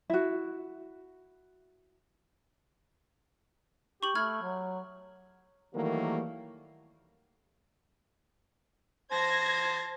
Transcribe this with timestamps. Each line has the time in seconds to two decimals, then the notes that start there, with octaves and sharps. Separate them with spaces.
0.10 E4 F#4
4.03 G4 C#6 F#7
4.15 A3 B5 F6 G#6
4.42 F#3
5.74 D#3 E3 F#3 G3 A3 A#3
9.12 C5 A5 G#6 A#6